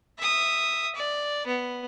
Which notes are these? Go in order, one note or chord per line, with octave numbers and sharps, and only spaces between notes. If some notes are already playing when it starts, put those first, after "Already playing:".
E5 D#6
D5
B3